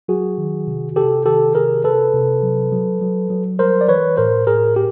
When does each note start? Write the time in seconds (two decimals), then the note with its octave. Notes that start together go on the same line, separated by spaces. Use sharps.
0.08 F#3 F#4 G#4
0.38 D#3
0.67 C3
0.96 C3 G4 A4
1.26 D#3 G4 A4
1.55 C3 G#4 A#4
1.84 C3 A4 B4
2.14 C3
2.43 F#3
2.72 F#3
3.01 F#3
3.30 F#3
3.59 G3 A#4 C5
3.81 D5
3.89 E3 B4 C#5
4.17 A2 A#4 C5
4.47 A2 G#4 A#4
4.76 G4